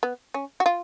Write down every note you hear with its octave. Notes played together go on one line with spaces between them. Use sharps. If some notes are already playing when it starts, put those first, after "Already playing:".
B3
C#4
F#4
F4